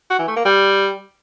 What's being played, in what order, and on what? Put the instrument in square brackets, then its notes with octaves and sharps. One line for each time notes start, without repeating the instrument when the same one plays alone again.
[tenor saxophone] F#4
E3
A3
A#3
G3